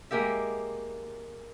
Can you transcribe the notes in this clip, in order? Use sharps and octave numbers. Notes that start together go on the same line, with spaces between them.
G#3 A#3 G4 E5